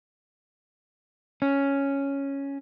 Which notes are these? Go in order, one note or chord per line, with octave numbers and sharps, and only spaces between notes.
C#4